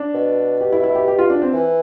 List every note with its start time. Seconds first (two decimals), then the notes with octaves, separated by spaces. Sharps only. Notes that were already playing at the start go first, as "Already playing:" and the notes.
Already playing: D4
0.14 B2
0.61 G4
0.72 E4
0.84 E4
0.95 G4
1.08 G4
1.19 F4
1.30 D4
1.42 C4
1.53 E3